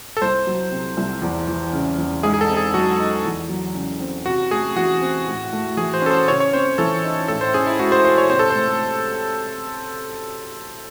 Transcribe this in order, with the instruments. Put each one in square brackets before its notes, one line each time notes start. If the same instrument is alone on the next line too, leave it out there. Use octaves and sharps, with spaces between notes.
[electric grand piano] A4
[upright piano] C2 [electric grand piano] C5
[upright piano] F#3
C3
C2
E2
E3
C#3
E2
[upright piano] G#2 [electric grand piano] G#4
[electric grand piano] G#4
A4
[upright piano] C4
[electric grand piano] G#4
[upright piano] F#3 [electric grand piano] F#4
[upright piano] D#4
E2
F#3
C#3
C4
[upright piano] C3 [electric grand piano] F#4
[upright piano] A3 [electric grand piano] G#4
[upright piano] E3 [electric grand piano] F#4
[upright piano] C4
A2
A3
[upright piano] E3 [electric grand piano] G#4
[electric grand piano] C5
[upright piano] C#4 [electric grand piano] A4
[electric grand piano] C5
[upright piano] C#3 [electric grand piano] C#5
[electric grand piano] C#5
[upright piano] C4 [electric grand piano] C5
[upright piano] E3 [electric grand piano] A4
[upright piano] D#4
[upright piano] A2 [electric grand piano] A4
[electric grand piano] C5
[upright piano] C#4 [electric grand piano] G#4
[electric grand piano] E4
[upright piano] G#3 [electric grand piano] F#4
[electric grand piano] C5
[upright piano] F#4 [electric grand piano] C5
[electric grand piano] C#5
[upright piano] C3 [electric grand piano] C5
[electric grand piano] A4
[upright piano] A3 [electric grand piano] C5